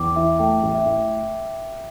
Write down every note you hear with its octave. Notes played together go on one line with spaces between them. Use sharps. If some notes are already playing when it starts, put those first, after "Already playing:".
Already playing: E2 G5 D6
E3 E5
A3 G5
A1
E5
A2